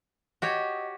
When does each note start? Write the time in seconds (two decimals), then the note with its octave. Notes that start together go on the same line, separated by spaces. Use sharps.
0.42 F#4 G4 C#5 D#5